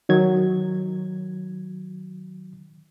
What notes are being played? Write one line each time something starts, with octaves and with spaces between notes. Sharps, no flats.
D#3 F#3 G#6